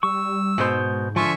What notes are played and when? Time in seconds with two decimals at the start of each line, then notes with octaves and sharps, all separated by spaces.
0.03 G3 C#6 E6
0.58 G#2 B2 G#3 C5
1.16 D3 F3 F4 E5 G#5 C#6